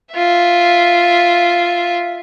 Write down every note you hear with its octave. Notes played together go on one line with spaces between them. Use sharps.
F4 E5